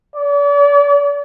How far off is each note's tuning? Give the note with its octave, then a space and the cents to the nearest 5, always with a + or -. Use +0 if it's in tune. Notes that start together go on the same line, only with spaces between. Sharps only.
D5 -40